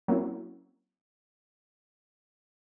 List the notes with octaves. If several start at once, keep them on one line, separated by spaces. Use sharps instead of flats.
F#3 A#3 C4 C#4 E4